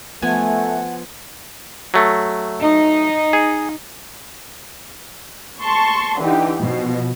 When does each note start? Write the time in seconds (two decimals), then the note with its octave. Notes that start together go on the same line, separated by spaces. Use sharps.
0.22 F3 A3 B3 F#5 G#5
1.94 F#3 A3
2.61 D#4
3.33 G#4
5.60 A5 C6 C#6
6.19 D3 E3 D#4 G4
6.60 B2 F3